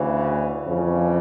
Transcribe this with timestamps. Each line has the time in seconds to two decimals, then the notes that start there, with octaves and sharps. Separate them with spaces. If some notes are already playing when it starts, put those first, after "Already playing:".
Already playing: D2 C#3 E3
0.67 F2 C#3 E3